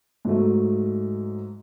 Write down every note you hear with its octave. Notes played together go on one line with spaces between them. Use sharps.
G#2 F#3 A3